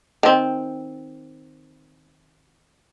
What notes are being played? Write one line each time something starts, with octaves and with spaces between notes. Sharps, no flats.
D#3 C4